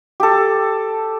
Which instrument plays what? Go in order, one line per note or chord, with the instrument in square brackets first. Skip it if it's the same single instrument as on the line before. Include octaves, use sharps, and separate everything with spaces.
[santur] G4 A4